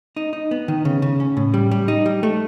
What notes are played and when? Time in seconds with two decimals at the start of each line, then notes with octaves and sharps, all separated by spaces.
0.16 D#4
0.33 D#4
0.51 B3
0.68 D#3
0.85 C#3
1.02 C#3
1.20 C#4
1.37 A2
1.54 G3
1.71 G3
1.88 D#4
2.06 G3
2.23 A3